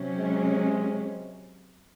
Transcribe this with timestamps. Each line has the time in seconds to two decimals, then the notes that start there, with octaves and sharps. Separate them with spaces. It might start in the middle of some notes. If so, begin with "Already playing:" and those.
Already playing: C3 F#3 C#4
0.18 G#3